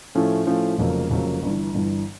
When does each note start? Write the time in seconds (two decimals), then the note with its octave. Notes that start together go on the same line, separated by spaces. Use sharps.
0.15 A2 F3 A3 C#4
0.47 A2 F3 A3 C#4
0.78 F1 F2 C#3 F#3 A#3
1.10 F1 F2 C#3 F#3 A#3
1.42 G1 G2 E3
1.74 G1 G2 E3